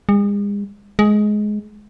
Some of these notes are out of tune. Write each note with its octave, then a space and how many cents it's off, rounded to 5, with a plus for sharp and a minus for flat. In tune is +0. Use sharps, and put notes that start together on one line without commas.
G#3 -40
G#3 +15